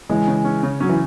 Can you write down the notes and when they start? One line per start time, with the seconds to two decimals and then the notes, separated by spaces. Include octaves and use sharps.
0.09 C#3 E3 G#3
0.27 C#3
0.45 C#4
0.63 C#3
0.80 F#3 C#4
0.89 E3